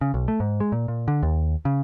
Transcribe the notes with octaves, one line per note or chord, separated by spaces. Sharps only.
C#3
B1
A3
G#2
G#3
A#2
A#2
D3
D#2
C#3